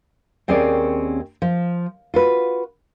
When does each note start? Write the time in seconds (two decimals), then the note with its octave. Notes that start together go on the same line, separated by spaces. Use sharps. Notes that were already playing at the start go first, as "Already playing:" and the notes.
0.48 D#2 C4 C#4 G#4 A#4 D5
1.42 F3
2.14 F4 F#4 B4